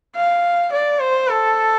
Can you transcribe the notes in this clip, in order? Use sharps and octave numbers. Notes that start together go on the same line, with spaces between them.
F5
D5
C5
A4